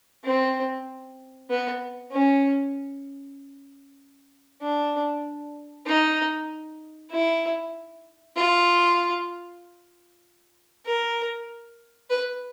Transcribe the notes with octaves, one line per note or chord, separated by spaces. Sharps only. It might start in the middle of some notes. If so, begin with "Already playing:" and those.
C4
B3
C#4
D4
D#4
E4
F4
A#4
B4